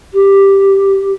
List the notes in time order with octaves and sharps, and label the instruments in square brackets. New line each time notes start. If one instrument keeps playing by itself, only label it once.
[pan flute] G4